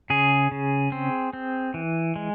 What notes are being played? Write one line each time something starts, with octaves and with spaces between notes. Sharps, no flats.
C#3 G#4
C#3
C4
C4
E3
G#3